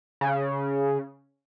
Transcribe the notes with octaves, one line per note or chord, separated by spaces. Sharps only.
C#3